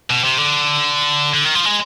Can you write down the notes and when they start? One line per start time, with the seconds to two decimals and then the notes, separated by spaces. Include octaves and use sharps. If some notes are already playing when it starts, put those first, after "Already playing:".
0.10 B2
0.24 C3
0.38 D3
1.34 D3
1.45 D#3
1.55 F3
1.66 G#3